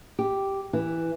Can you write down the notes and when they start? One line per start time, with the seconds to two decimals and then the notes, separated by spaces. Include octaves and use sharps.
0.19 G4
0.73 E3